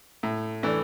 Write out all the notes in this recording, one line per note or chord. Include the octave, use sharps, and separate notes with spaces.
A2
E3 A3 D4